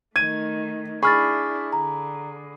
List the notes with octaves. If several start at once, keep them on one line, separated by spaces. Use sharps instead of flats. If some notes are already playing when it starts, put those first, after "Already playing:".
D#3 A3 G#6 D#7
D4 E4 G#4 B5 C#6 F6 A6
D3 A#5